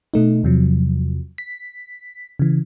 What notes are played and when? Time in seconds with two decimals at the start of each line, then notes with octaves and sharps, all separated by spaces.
0.14 B2 A3 D#4
0.43 E2 C3 F3 F#3
1.38 B6
2.39 C#3 E3